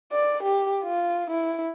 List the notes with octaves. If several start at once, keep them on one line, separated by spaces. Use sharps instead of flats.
D5
G4
F4
E4